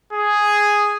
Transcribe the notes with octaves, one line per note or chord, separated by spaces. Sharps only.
G#4